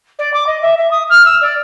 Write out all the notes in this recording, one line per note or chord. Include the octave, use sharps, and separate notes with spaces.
D5
D6
D#5
E5
E5
D#6
F6
E6
D5